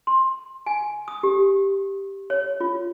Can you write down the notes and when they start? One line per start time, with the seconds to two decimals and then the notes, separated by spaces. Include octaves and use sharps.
0.07 C6
0.66 G#5
1.08 D#6
1.23 G4
2.30 C#5
2.60 F4